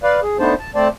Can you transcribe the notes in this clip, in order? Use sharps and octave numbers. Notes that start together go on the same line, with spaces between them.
B4 D5 F5
G#4
A3 B3 D4 D#4 C5 A5
A5
A3 C4 C5 D5 A5